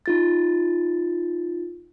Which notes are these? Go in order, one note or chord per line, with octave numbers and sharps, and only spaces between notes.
D#4 F4 A6